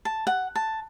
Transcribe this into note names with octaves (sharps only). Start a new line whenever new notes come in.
A5
F#5
A5